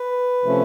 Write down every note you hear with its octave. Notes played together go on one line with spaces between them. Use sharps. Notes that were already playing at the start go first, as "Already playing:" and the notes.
Already playing: B4
C3 F3 A3 C#4